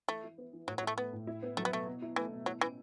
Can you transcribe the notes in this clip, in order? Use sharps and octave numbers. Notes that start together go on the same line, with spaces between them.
E3 A3
E4
B3
E3
A2 F#3
F#3
A3 E4
A3 B3
A2
E4
B3
F#3 A3
B3
B2 A3
B2
E4
E3 A3
B2
F#3 E4
E3 C#4